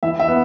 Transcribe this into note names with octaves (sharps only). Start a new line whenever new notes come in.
E3 E5
E5
B3